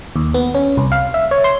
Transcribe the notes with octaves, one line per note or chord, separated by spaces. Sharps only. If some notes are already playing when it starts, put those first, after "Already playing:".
D#2
B3
C#4
C2
F5
E5
C#5
C6